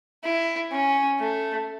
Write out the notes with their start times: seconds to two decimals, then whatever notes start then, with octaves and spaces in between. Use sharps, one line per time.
0.24 E4
0.72 C#4
1.20 A3